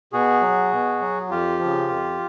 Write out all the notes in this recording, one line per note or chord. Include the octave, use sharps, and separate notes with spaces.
B2 F#4 G#4
F#3
B2
F#3
F2 F4 G4
F3
C#3
F2